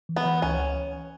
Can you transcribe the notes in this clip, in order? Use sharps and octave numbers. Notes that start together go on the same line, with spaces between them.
E3
B3
E3
C#2 C#4